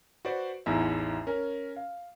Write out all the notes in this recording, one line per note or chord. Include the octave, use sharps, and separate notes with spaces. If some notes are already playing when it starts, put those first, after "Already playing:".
F#4 B4 C5 D5
A1 E2 D#4 E4 E5
C#4 A#4
F5